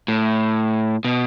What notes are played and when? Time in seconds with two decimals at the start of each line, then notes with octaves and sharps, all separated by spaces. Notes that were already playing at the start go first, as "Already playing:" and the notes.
0.08 A2
1.05 B2